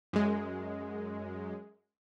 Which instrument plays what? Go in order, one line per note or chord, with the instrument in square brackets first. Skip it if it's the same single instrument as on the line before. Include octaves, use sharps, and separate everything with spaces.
[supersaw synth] F#2 G#3